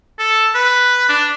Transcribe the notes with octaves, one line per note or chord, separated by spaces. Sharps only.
A4
B4
D4